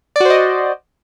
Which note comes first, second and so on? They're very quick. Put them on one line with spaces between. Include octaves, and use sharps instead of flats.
D5 F#4 C5 D#5